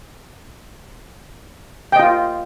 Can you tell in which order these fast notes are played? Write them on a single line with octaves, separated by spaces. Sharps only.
G5 D#5 F4